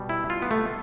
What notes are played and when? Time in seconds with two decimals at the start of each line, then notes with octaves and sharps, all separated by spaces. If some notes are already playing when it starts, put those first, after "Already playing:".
Already playing: B2 G3
0.09 E4
0.30 F4
0.42 B3
0.51 A3